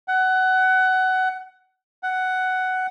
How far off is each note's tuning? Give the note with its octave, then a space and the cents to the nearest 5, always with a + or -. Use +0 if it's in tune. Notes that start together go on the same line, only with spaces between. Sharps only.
F#5 +20
F#5 +10